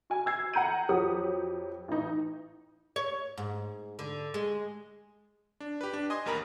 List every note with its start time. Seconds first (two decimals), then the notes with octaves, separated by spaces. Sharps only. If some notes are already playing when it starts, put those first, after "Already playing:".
0.10 F#4 G#5
0.26 E6 G#6 C7
0.54 F#5 A#5 G6 D#7
0.89 F2 F#3 G4 D#6
1.88 A1 D#4
2.96 C#5
3.37 G#2
3.99 D3
4.34 G#3
5.60 D4
5.81 G4 B4
5.93 D4
6.10 D#5 G#5 C6 D#6
6.25 A1 D#2 A#4 A#5 B5